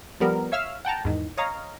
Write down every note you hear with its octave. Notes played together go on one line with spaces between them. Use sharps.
F3 G3 B3 A#4
C#5 E5 F5 E6 F6
F#5 G5 A5 A#5
E2 G#2 D#3
C#5 D#5 F5 A#5